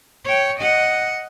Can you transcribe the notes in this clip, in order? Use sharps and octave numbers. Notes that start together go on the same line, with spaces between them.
C#5 G5
D#5 F#5